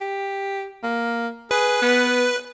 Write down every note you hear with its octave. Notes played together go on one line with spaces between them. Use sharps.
G4
A#3
G#4 B4
B3